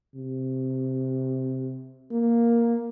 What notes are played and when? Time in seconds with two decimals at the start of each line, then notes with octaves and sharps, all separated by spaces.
0.15 C3
2.11 A#3